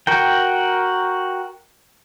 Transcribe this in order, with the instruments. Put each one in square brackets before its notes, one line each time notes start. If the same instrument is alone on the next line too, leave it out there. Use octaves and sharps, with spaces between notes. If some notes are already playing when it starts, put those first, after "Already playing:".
[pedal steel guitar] F#4 A#4 G5